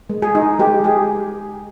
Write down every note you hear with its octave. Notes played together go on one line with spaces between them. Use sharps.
G#3
G#4
D#4
G#3 G4
G4 G#4